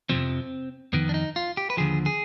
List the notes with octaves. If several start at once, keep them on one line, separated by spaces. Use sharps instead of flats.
F2 C3 F3 C4
F2 D#3 B3
D4
D#4
F4
G4
B4
D#2 D3 F3 G#4
G#4